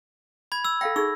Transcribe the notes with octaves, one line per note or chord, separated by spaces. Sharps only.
B5 G#6
E6
A4 F5 G5 A#6
D#4 G#4 C#6 E6